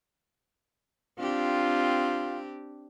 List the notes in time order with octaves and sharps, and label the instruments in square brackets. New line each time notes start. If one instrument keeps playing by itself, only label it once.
[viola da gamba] C4 D4 G4 [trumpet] F4